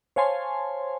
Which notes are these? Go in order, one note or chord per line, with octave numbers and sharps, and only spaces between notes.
C5 C#5 F5 G#5 A5 C6